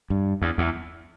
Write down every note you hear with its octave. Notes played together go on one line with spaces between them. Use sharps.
G2
E2
E2